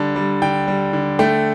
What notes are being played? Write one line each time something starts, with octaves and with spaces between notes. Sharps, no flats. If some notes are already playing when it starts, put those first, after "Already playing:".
Already playing: D3 G3 A5
G3
D3 G5
G3
D3
A3 G5